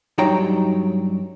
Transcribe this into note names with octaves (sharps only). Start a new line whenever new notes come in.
G2 F#3 D#4 C#5 G5 A#5